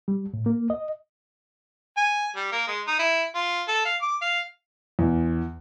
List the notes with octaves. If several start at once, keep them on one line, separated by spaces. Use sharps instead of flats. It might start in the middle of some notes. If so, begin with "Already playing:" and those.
G3
A2
A#3
D#5
G#5
G3
A#3
G#3
D#4
E4
F4
A4
F5
D6
F5
E2